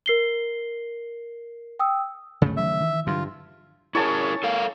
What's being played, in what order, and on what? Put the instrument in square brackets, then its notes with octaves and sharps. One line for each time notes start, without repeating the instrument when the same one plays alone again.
[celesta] A#4 C7 G7
G5 D#6 E6
[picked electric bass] D1 G1 [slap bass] C#3 A3
[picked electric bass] D#3 F#3 C#4 [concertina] E5
[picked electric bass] D#3 E3
[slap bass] G2 [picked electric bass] D3 E3 F#3 [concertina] F4
[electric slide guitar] E4 G#4 A#4 [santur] C#5 G#5 A5
[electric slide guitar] A4 A#4 F5